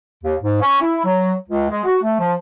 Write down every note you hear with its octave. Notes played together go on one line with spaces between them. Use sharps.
D#2
G#2
C#4
E4
F#3
C#2
G#3
F#4
A3
F3